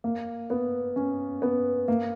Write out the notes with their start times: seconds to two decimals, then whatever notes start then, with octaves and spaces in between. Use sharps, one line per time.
0.04 A#3
0.50 B3
0.96 C#4
1.42 B3
1.88 A#3